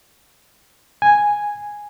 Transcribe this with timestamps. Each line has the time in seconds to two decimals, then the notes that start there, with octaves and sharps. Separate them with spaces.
1.02 G#5